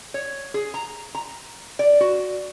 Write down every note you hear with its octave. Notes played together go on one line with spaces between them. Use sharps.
C#5
G#4
A#5
A#5
D5
F#4